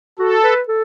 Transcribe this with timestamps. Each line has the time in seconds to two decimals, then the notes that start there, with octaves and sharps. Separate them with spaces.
0.19 F#4 A4
0.44 B4
0.68 A4